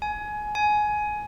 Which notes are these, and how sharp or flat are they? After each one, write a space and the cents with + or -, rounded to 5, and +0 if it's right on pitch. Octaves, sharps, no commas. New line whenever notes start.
G#5 +20
G#5 +15